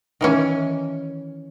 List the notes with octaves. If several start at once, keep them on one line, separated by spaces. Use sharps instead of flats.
D#3 E3 C#4